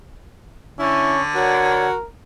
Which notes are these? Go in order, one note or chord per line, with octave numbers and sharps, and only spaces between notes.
D3 C#4 E4
F#4 A#4 C#5 D5 F#5